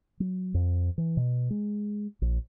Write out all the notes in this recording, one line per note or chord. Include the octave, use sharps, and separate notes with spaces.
F#3
F2
E3
B2
G#3
A#1